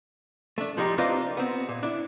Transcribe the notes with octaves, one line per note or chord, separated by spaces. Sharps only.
A3 D4
F3 G3 G#3 D#4 G4
A#3 C4 D4 D#4 F4 B4
B3 C4
A#2
D4 E4